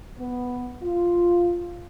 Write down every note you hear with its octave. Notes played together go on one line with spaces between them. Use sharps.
B3
F4